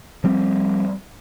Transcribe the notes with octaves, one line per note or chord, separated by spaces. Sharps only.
F3 G3 C4